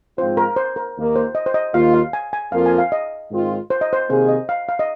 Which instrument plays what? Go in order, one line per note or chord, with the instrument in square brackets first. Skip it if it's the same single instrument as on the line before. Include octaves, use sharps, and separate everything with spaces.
[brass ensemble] G#2 F3 C4 F4 [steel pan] C5
[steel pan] A#4
C5
A#4
[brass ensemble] D#2 D#3 A#3
[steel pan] C5
D#5
C5
D#5
[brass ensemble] D#2 D#3 A#3 F4 [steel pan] F5
[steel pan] F5
G#5
G#5
[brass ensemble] F2 F3 A#3 F4 A#4 [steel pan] F5
[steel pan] G#5
F5
D#5
[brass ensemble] G#2 D#3 C4 F4
[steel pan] C5
D#5
C5
[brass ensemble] C3 D#3 A#3 G#4 [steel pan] C5
[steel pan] D#5
F5
F5
D#5